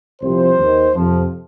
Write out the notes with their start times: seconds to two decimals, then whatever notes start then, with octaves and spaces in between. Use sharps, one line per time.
0.22 C2 C3 F3 C5
0.59 D#2 D#3
0.95 F2 C3 F3